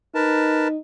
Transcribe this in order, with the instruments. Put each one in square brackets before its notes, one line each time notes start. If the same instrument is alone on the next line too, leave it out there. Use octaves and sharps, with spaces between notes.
[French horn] D#4 [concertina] A#4 B4 A5